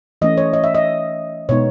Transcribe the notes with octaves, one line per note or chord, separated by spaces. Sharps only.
E3 A3 C#4 D#5
C#5
D#5
E5
D#5
B2 G#3 B3 D#4 C#5